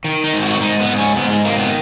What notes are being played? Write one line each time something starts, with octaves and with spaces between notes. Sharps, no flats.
D#3
D#4
G#2
F#4
G#2 D#4
B3
G#2
C#4
G#2 B3
G#3
D#3 A#3
B3